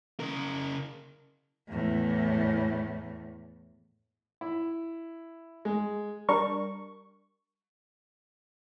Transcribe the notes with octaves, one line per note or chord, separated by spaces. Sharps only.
C#3 A#4
E2 A2
E4
G#3
G3 D4 A#4 C#6